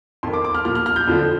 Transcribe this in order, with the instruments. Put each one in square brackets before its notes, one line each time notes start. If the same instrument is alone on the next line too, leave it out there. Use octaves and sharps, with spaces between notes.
[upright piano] F2 D#3 C6
D6
D6
F6
A#2 F3 F6
F6
F6
G6
F2 D3 F3